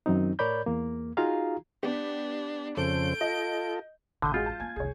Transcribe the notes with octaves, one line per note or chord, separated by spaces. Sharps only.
F#2 D#3 F#3 C4 D#4
A2 A#4 C#5 D5 B5 G6
E2 A#3
D#4 F4 F#4 G#4 F5 A#5
B3 D4 G4
F2 C#3 A4 C5 G6 D7
F4 A4 D#5
A1 F#2 D3 B5 D#6 G6
G#3 F4 F#4 G#4
A5
A#3 C4 G#5 G#6
F1 C2 G#4 C#5